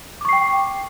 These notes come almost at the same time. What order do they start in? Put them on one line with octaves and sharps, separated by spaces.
D6 C#6 C7 G5